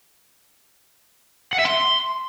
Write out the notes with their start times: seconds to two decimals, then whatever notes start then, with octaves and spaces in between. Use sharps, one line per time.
1.53 F#5
1.59 E5
1.65 C6